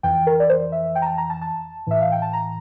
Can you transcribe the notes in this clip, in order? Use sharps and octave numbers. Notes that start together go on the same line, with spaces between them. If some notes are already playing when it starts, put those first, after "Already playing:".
F2 E3 G5
A#4
D5
C5
E5
G5
A#5
A5
A#5
A5
A5
A2 E3 E5
F5
G5
A5
A#5